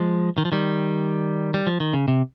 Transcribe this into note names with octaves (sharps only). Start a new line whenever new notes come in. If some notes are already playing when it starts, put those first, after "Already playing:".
Already playing: F3 G#3
D#3
F3
D#3 G3
G3
F3
D#3
C#3
C3